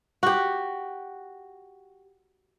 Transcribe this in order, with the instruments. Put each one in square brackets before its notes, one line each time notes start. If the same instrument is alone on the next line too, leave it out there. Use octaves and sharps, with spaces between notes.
[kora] F#4 G4